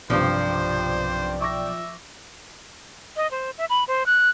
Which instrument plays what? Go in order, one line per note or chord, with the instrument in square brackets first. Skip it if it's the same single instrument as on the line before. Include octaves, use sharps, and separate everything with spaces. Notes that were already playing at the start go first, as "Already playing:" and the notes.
[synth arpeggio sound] B1 D5 G5 [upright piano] G2 C3 C7 [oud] F3 [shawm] C5
[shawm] E5 [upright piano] C#6 D6 A#6
[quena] D#5
C5
E5
B5
C5
F#6